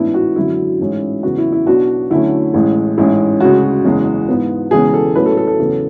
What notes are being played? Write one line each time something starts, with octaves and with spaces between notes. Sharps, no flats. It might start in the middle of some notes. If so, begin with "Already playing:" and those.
Already playing: A1 G#2 E3 B3 D4 E4
F#4
G#1 F#2 D3 F#3 E4
A1 G#2 G#3 C#4
E2 C#3 F#3 B3 F#4
E4
E4
B1 B2 F#3 B3 D4 F#4
D2 D3 F#3 A3 C#4 E4
A1 A2 G#3
A1 G#2 G#3 C#4 E4
D2 C#3 G#3 F#4
F#1 E2 C#3 G#3
G#2 E3 B3
E1 E2 C#3 G#3 B3 G#4
A4
B1 A2 F#3 A3 C#4 B4
A4
A4
A4
E2 C#3 F#3 B3